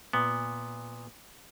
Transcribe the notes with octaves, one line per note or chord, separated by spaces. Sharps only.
A#2 B3